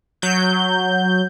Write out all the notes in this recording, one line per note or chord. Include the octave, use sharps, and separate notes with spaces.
F#3 G6